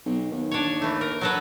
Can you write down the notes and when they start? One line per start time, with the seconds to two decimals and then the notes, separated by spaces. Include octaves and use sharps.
0.05 B1
0.31 D#2
0.51 D4 C#5
0.81 E3 A3
1.01 A#4
1.21 F#3 A4 B4